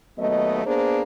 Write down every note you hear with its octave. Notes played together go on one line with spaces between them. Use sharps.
D#2 F#3 A3 B3 D#5
A#3 B3 D4 G#4 C5